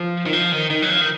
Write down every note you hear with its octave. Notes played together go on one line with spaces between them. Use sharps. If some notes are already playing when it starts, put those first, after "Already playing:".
Already playing: F3
D#3
F3
D#3
D#3
F#3
F3
D#3